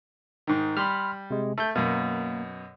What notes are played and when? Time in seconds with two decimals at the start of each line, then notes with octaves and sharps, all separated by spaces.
0.47 G#2 D#3
0.77 G3 B5 C6 F6
1.30 C3 G#3
1.58 A3 A4 G6
1.75 F#2 B2 A#3